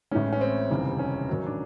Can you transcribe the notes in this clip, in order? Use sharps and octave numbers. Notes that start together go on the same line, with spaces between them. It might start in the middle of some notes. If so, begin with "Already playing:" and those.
A1 A2 E3 G#3 C#4
C#4
C4
F1 D#2 C#3 E3 G3
C#4
A1 G#2 D#3 F#3
D4